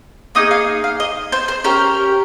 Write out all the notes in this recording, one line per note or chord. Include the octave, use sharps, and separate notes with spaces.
A#3 D#4 G#4 D#6
F5
F5
D#5
C5
C5
C#4 G4 A#4